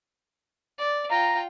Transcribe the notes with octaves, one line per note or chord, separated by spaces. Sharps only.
D5
F4 G5 A#5